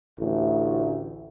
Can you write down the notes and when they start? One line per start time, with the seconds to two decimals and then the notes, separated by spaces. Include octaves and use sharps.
0.19 A1 D2 A3